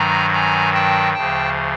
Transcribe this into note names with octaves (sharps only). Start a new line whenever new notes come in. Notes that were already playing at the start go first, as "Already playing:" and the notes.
Already playing: G2 D#3 F#3 G#5 A#5
G#5 A#5
G5 A5
D2 C#3 F3 G5 A5